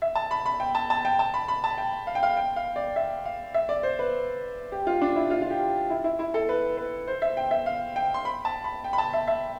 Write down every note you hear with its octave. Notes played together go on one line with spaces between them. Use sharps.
E5
A5
B5
B5
G5
A5
A5
G5
A5
B5
B5
A5
G5
F5
G5
F5
G5
F5
D5
E5
F5
E5
D5
C5
B4
G4
F4
D4
E4
F4
F4
G4
E4
E4
E4
A4
B4
B4
C5
E5
G5
E5
F5
G5
C6
B5
A5
B5
G5
B5
A5
E5
E5